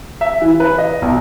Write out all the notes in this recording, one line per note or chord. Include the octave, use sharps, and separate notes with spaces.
E5
E3
B4
D#5
B1